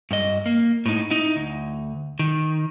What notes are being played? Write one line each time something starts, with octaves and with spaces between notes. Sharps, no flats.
G2 D#5
A#3
A2 D#4
D#4 E4
D2
D#3